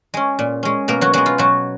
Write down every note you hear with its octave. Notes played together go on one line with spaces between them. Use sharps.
G#3 C#4
A#2
G#3 C#4
B2 A#3 A#4
F#3 F#4
F#3 G#3 B3 F#4
F4
B2 F#3 F#4